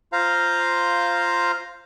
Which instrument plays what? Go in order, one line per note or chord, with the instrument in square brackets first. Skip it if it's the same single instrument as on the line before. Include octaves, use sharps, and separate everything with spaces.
[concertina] F4 C5 F5 A#5